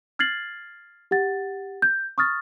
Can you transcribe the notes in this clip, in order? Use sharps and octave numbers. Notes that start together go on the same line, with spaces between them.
F6 G#6 A6 C7 F#7
G4 F#5 A6
G6
C#6 D#6 F6 A6